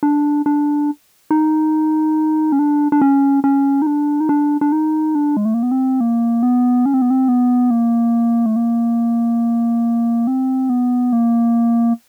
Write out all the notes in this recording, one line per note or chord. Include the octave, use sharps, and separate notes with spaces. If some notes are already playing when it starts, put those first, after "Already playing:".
D4
D4
D#4
C#4
D4
D4
C#4
C#4
D#4
D4
D#4
D4
D4
D#4
D4
G#3
A3
A#3
B3
C4
A#3
B3
C#4
C4
B3
C4
B3
A#3
A3
A#3
C4
B3
A#3